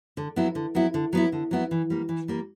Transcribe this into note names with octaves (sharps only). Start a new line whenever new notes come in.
D3
F#3 B3 E4
D3
F#3 B3 E4
D3
F#3 B3 E4
D3
F#3 B3 E4
E3
G3 A#3
E3
G3 A#3